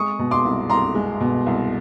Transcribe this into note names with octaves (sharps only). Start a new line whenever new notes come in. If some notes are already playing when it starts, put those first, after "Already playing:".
Already playing: G#3 C#6 D#6
B2
C6 D6
C2
C2 A#5 C6
G#3
B2
C2